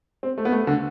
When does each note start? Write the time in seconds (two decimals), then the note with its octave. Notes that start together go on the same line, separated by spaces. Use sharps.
0.23 C4
0.38 A3
0.45 B3
0.52 A3
0.67 D3